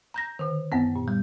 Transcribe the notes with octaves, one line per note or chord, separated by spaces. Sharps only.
A#5 G6 A#6
D3 D#3
F#2 B3 C4
A#2
G3